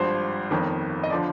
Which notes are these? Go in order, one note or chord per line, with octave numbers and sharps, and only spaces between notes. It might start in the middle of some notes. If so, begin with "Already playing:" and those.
Already playing: G#1 G2 F3 C5
G1 F2 D#3
D#5
D3 F3 D5